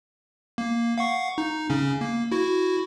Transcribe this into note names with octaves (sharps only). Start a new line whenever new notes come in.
A#3
F5 F#5 C#6
D#4
C#3 C#4
A#3
E4 F#4